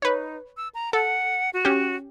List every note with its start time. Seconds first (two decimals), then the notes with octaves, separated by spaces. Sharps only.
0.02 D#4 B4 C#5
0.57 E6
0.75 A#5
0.93 A4 F#5
1.53 F#4
1.65 C#4 G4